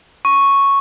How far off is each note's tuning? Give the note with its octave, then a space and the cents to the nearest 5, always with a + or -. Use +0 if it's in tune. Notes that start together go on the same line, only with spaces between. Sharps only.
C#6 -5